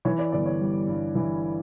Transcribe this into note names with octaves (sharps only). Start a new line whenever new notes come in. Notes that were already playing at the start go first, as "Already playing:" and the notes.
E3 C#5
D5
G1 D5
C#5
G3
G2
E3